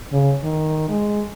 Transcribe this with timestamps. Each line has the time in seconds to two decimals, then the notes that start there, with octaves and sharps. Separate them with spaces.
0.12 C#3
0.44 D#3
0.89 G#3